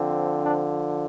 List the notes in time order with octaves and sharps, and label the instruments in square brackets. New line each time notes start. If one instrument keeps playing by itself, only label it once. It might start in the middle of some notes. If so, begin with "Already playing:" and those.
Already playing: [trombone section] D3 F3 C4
D4